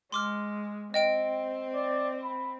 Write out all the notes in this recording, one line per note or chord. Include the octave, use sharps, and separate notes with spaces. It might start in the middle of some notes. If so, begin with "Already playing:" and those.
G#3 C6 D6 F6
C4 D#5 G5 D7
D5
B5